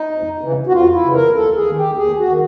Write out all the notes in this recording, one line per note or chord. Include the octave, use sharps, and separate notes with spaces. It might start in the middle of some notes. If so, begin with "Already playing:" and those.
Already playing: D#4
F2
C#3 E3
F#4
F2 F4
E4
C#3 E3
A#4
D#2 A4
G#4
D#3
G4
D#2 G#4
F#4
D#3